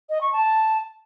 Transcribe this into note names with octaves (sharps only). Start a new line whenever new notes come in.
D#5
C#6
A5